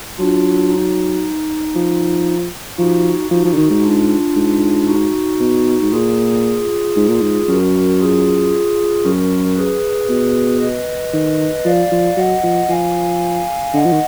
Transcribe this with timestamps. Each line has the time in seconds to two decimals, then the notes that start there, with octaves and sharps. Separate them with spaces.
0.19 F#3 D4 F4
0.70 D#4
1.75 F3
2.79 F3 D#4 F#4
3.31 F3 D#4 F#4
3.44 F3
3.53 D3
3.57 D#3
3.70 G#2
3.83 D4 F4
4.36 G#2
4.87 D#4 F#4
5.40 B2
5.82 G#2
5.92 A#2 F4 G#4
6.96 G#2
7.09 A#2
7.21 G#2
7.48 F#2 F#4 A#4
8.00 F4 G#4
9.05 F#2 F#4 A#4
9.57 G#4 B4
10.09 B2
10.61 B4 D#5
11.13 D#3
11.65 F3 D5 F5
11.92 F3
12.17 F#3 D#5 F#5
12.43 F3
12.69 F3 F5 G#5
13.74 D3 D#5 F#5
13.85 F3
13.92 D#3